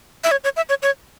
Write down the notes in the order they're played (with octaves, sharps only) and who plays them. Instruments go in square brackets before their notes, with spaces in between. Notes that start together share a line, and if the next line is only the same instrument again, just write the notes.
[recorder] E5
C#5
C#5
E5
C#5
C#5